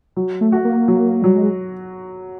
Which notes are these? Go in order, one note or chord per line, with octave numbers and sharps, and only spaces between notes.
F#3
A3
F#4
A#3
F#3
F#3 G3
G#3